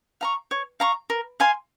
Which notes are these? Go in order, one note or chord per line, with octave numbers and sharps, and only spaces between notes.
F5 A#5 C#6
C#5
F5 A#5 C#6
A#4
F5 G#5 C6